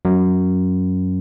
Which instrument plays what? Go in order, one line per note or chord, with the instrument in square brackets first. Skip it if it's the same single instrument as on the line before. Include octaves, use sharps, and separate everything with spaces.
[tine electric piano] F#2